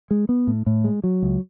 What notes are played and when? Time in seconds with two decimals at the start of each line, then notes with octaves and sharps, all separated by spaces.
0.11 G#3
0.29 B3
0.47 A2
0.66 A2
0.84 G#3
1.04 F#3
1.22 C#2